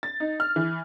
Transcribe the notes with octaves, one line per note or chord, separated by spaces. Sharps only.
A6
D#4
F6
E3